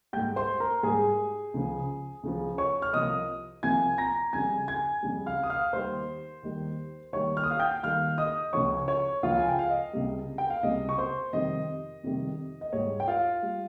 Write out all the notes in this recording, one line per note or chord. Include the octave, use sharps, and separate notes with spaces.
G#2 G3 G5 G6
C5 C6
A#4 A#5
G#2 G3 G#4 G#5
C#2 C#3 F3
C#2 C#3 F3
C#5 C#6
F6
C2 C3 F3 D#5 D#6
C2 C3 F3 G#5 G#6
A#5 A#6
F2 C#3 G3 G#5 G#6
G#5 G#6
F2 C#3 G3
F5 F6
D#6
F5 F6
D#2 D#3 G3 C5 C6
D#2 D#3 G3
D#2 D#3 G3 C#5 C#6
F6
D#6
F5 F6
G5 G6
D#2 D#3 G3 F5 F6
D#5 D#6
C#2 C#3 F3 C#5 C#6
C#5 C#6
C#2 C#3 F3 F4 F5
G#5
G5
F5
D#5
C#2 C3 G3
G5
F5
C#2 C3 G3 D#5
C#6
C5 C6
F2 C3 D#3 G3 D#5
F2 C3 D#3 G3
D#5
G#2 G3 C#5
G5
F4 F5
G3